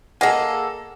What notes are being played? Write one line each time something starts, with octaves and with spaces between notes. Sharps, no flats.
A#3 G#4 A4 D#5 F#5 G#5